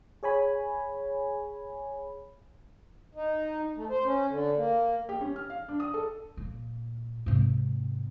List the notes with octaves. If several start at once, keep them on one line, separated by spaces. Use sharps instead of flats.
G#4 C#5 G#5 B5
D#4
A3
C5
C#4
D3
A#3
G4
C#4
F6
F5
D4
D#6
A4
A#2
G#2 C3